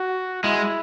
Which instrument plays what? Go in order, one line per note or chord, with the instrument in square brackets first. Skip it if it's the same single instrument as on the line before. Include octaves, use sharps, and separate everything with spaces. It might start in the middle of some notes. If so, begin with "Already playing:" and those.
Already playing: [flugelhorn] F#4
[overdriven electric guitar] G#3 [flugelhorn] E4